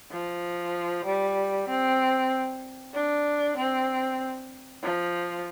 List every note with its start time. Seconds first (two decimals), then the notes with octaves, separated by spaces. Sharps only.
0.12 F3
1.05 G3
1.69 C4
2.94 D4
3.58 C4
4.83 F3